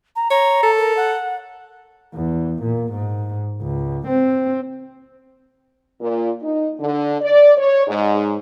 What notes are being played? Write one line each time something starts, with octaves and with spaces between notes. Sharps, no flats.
A#5
C#5 A#5
A4
A#4
F#5
E2
A#2
G#2
C#2
C4
A#2
D#4
D3
D5
C#5
G#2